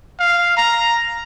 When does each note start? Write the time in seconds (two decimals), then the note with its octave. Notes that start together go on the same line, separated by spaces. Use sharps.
0.20 F5
0.57 A#5